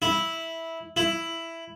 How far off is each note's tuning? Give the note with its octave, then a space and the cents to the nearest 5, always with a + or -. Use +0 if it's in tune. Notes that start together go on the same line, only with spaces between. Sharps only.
E4 -10
E4 +5